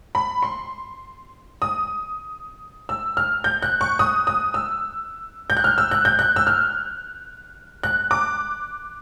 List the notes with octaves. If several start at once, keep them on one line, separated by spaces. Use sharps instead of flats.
B5
C6
D#6
E6
F6
G6
F#6
C#6
D#6
D#6
E6
G6
F#6
F6
E6
F#6
G6
F#6
E6
F6
F#6
D6